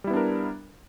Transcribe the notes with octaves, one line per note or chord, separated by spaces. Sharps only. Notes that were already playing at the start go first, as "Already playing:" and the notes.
G3 B3 D4 E4 A#4